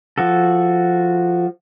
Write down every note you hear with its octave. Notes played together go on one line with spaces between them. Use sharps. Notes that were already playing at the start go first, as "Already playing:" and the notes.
F3 F#4 A4